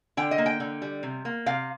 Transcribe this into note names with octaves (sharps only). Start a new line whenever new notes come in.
D3 G5
D#5
A#3
G5
D3
G3
C3
A#3
C3 F5